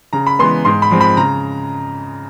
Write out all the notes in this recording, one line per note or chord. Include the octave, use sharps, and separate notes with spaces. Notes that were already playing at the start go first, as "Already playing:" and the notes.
C#3 A#5
B5
E3 G#3 B3 C6
G#2 C6
B5
F3 G#3 C4
B5
C#3 A#5